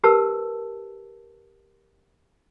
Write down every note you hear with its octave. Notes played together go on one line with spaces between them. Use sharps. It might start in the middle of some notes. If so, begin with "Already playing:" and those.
G4 A#4 B4 A5 E6